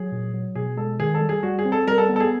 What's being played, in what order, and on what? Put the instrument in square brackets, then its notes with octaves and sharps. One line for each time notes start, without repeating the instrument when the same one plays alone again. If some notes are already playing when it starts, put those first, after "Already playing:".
Already playing: [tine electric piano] F#3 [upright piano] G#4
[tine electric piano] A#2
F#3
[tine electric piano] B2 [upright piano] G#4
[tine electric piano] G#3 [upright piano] A4
[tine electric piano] D#3 [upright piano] G#4
[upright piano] A4
[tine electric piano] G3
[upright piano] G#4
[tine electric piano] G3 [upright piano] F#4
[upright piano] G#4
[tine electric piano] C4
[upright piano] A4
[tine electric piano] G3 [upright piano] A#4
[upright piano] A4
[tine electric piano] B3
[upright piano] A4
G#4